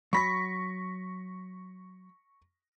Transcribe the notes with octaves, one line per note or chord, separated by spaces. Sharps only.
F#3 B5 C#6 A#6 B6